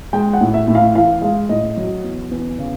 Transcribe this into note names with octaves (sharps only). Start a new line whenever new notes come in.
G#3 G5
F#5
A2
E5
A2
F5
E3 F5
G#3 F5
A2 D#5
F#3
E2
E2
C#3